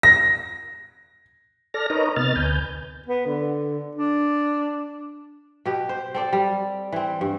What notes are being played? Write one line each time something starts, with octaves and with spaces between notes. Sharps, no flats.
A#6
A4 D5 F6 A#6
D#4 A#4 B4 C#5 D#5 A#5
C3 B3 D#5 F6 A6
D2 B4 G#5 G6
B3
D3
D4
B2 B3 G4
C5
C4 A4 D5
G3
E3 C4
G2